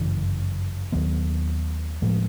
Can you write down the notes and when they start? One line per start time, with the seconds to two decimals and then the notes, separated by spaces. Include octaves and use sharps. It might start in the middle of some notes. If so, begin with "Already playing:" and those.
Already playing: G1 F#2 C#3 E3
0.92 D#2 D#3 F#3 B3
2.02 A2 F3 G#3